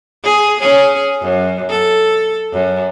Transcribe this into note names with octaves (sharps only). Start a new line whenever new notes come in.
G#4
C#4 G#4
F#2
A4
F#2